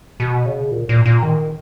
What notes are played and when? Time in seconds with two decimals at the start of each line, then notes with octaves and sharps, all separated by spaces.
0.20 B2
0.46 C#3
0.71 A#2
0.89 A#2
1.05 A#2
1.23 D#3